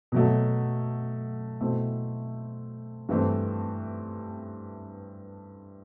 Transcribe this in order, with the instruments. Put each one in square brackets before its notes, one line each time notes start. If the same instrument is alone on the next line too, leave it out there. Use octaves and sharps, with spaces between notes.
[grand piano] B2 F#3 A3
B2 A3 C4 E4
G2 E3 A3 C4